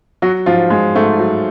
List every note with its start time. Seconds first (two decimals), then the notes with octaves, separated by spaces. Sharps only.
0.22 F#3 F#4
0.46 G#2 F3 F4
0.70 F#3 G#3
0.95 G#2 A3
1.19 F#3